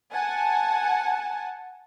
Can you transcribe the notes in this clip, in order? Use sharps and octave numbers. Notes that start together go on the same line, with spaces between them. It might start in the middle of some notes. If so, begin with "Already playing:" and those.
F#5 G#5 A5